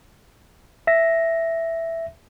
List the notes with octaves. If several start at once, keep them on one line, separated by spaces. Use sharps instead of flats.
E5 A#6